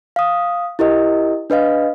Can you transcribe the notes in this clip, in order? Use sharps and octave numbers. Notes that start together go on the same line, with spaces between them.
F5 D#6
E4 G4 A#4 D#5
D4 B4 D#5 F5